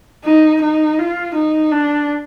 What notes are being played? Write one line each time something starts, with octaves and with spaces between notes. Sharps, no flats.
D#4
D#4
F4
D#4
D4